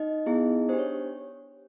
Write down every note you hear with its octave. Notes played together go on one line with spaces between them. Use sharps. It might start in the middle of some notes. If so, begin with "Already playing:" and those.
Already playing: D#4 D#5
B3 E4 G#4
D4 G4 C5
C#5